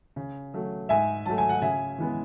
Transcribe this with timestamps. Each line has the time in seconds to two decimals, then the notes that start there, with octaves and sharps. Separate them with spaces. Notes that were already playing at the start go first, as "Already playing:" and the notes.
0.16 C#3
0.54 F#3 A3
0.89 G#2 E5 G#5
1.25 F#3 A3 A5
1.38 G#5
1.49 F#5
1.62 C#3 E5 G#5
1.98 E3 G#3 B3